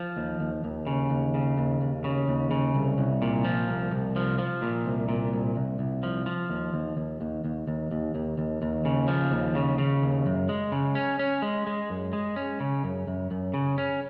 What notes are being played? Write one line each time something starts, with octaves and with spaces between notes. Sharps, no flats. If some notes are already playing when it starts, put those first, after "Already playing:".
Already playing: F3
D#2
D#2
D#2
C#3
D#2
C#3
D#2
D#2
C#3
D#2
C#3
C2
C2
A#2
F3
C2
C2
F3
F3
A#2
C2
A#2
C2
C2
C2
F3
F3
D#2
D#2
D#2
D#2
D#2
D#2
D#2
D#2
D#2
D#2
C#3
F3
D#2
C#3
C#3
D#2
F#2
G#3
C#3
C#4
C#4
G#3
G#3
F#2
G#3
C#4
C#3
F#2
F#2
F#2
C#3
C#4